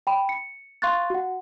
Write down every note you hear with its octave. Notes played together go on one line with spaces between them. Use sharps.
G5 B5
C#7
F5 C6 C#6 F#6 A6
F#4 F#5